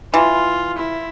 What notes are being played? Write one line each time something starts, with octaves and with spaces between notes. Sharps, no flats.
E3 F4
E4